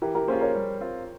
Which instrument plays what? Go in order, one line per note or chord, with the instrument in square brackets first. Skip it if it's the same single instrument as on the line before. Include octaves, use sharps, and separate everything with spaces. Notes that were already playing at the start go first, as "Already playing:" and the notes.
[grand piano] E3 [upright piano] G4 A#4
[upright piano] G4 A#4
[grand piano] A#3 C#4 F4 [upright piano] G#4 C5
[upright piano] A#4 C#5
[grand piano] G3
C4 F4